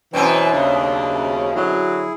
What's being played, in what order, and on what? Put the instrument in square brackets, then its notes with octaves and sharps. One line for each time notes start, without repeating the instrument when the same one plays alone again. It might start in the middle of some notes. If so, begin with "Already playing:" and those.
[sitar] F#2 B2 C4 [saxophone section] E3 [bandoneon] C#5 G5
[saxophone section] D#2 C#3 [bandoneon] D4
[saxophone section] D3 F#3 [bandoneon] E4 G#4